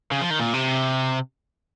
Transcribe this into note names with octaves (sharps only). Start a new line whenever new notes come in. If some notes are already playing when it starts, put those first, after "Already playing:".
C#3
F3
D#3
A#2
C3